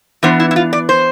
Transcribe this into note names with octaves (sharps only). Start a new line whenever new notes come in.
E3 B3 D4 C5
E4
E4
F4
D5
C5